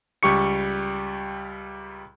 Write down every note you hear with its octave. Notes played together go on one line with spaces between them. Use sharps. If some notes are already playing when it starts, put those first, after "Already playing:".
C#2 G3 G4 C#6 C#7